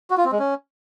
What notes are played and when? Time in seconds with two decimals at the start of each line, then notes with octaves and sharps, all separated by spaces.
0.10 F#4
0.18 F4
0.25 C4
0.32 G#3
0.39 C#4